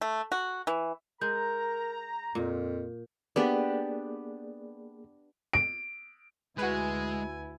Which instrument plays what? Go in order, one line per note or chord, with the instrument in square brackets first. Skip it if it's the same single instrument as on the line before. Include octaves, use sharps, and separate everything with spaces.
[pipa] A3
F#4
E3
[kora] G#3 [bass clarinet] A#4 [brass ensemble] A#5 [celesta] G6
[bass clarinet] F2 [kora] A#2
[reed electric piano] A#3 G#4 D5 [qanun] B3 D4 G4
[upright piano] D7
[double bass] D2 E4 [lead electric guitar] G#3 [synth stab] F#4 B4 [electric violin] G#5